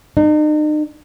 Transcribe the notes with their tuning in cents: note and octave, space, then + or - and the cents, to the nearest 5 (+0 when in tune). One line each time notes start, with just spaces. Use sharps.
D#4 -40